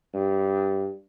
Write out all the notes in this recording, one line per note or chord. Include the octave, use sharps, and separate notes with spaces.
G2